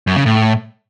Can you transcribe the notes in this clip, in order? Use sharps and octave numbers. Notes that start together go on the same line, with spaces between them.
F#2
C#3
A2